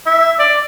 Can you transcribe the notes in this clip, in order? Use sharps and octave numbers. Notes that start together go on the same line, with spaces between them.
E5
D5